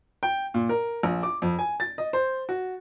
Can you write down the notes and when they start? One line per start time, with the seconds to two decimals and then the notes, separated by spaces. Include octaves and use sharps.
0.23 G5
0.54 A#2
0.69 A#4
1.03 A#1
1.23 D6
1.42 F2
1.59 G#5
1.80 A6
1.98 D#5
2.13 C5
2.49 F#4